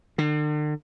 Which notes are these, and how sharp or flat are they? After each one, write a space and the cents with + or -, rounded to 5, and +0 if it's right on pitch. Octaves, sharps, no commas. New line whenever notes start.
D3 +45